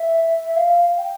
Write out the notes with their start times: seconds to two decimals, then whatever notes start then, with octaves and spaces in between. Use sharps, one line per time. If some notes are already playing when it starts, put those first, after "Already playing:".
Already playing: E5
0.44 E5
0.56 F5
0.97 G5